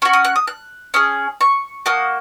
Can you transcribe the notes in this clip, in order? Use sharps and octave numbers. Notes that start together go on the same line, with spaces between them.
C#4 F#4 C#6
D#6
F#6
D#6
F#6
C#4 G#4 D#6
C#6
A#3 F#4 D#6